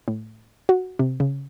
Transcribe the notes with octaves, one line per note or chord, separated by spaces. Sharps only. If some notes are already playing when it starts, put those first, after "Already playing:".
A2
F#4
C3
C#3